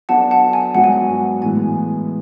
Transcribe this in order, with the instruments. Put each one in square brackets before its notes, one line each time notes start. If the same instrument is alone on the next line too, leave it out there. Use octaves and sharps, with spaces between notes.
[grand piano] F#3 B3 D4 A4 [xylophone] F#5 A5
[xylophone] F#5 A5
G#5
[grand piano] G#2 F#3 B3 D4 F#4 [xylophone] F#5
[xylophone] G#5
F#5
[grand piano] A2 E3 G#3 B3 [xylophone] G#5